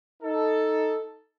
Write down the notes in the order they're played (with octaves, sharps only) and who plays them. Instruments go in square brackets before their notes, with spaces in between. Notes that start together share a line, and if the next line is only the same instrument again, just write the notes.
[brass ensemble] D#4 A4